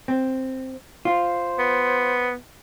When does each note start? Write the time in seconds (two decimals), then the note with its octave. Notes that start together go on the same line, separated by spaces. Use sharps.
0.08 C4
1.05 F4 C5
1.59 B3